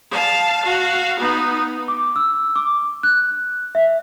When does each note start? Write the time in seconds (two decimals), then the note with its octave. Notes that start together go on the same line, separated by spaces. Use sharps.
0.11 F5 A5
0.63 F#4 F5
1.19 B3 D#4
1.88 D6
2.16 E6
2.56 D6
3.03 F#6
3.75 E5